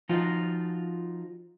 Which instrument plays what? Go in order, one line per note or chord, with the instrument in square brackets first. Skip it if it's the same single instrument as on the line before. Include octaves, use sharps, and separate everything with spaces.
[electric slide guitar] F3 D#4 F4 F#4